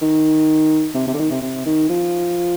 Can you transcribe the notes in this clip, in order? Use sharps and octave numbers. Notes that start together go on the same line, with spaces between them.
D#3
C3
C3
D3
D#3
C3
C3
D#3
F3